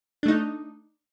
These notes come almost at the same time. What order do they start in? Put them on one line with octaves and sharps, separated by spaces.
D4 A3 D#4